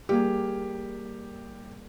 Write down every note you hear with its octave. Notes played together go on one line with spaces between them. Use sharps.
G3 A#3 G4 G#4